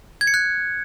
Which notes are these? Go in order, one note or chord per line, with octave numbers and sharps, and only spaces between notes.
G#6
C#7
F#6